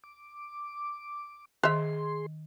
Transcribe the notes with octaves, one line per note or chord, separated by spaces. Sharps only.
D6
D#3 G#4 C5 E5 C6